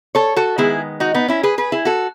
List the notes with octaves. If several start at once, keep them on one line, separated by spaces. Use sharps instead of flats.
A4 C#5
F#4 A4
D#3 G#3 B3 E4 G#4
D#4 F#4
B3 D#4
C#4 E4
G#4 B4
G#4 B4
E4 G#4
F#4 A4